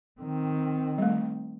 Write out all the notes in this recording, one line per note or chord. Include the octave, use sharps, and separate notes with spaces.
D#3 C4
G3 A3